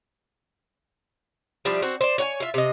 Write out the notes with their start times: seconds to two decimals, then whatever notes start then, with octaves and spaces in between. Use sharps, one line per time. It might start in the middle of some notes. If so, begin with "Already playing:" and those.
1.65 F3 G3 D4 E4
1.82 C4 F#4
2.01 C5 D5
2.18 C#5 F#5 G#5
2.40 F4 E5
2.54 C3 D#5